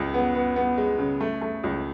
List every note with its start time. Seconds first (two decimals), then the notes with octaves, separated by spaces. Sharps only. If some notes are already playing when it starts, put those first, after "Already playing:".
Already playing: C#2 C#3
0.14 B3
0.35 B3
0.56 B3
0.78 G#3
0.99 C#3
1.21 A3
1.41 A3
1.64 C#2